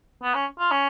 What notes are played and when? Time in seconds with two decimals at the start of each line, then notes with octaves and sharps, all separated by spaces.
0.23 B3
0.34 C#4
0.59 F4
0.71 C#4